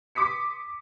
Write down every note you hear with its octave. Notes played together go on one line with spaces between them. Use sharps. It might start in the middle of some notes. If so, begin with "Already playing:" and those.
C6 D6 D#6 B6 C#7